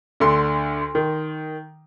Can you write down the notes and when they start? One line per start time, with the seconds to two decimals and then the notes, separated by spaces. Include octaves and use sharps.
0.20 D2 D3 C6
0.95 D#3